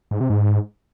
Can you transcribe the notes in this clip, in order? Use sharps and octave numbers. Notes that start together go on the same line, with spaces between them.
G#2
C3
G#2